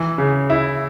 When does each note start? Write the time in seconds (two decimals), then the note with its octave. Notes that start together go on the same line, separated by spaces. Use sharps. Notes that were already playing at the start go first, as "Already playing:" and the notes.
Already playing: E3
0.18 C#3
0.50 E4